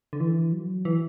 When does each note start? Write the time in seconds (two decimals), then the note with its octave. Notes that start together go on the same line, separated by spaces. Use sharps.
0.13 D3
0.20 E3
0.52 F#3
0.85 E3